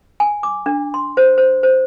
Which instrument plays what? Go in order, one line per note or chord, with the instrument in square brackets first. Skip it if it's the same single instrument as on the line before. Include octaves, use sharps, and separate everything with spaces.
[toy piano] G#5
D6
D4
C6
C5
C5
C5